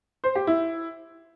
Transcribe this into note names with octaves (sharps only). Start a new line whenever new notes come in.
C5
G4
E4